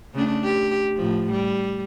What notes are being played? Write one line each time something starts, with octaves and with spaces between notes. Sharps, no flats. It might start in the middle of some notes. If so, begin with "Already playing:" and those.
C#3 A3 D4
G4
A2 F3
G3